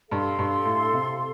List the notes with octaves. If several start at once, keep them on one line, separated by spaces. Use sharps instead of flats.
G2 A4 F5 C6
G2
A2
C3